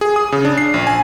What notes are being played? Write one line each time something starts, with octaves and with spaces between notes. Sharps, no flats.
G#4
D#6
C#3
D4
C7
A#1
G#5